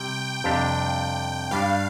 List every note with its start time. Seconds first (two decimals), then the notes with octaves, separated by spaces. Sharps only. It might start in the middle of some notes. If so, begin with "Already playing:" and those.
Already playing: C3 G3 G5
0.44 F2 C3 G3 D4 G4
1.51 G2 G3 D4 F5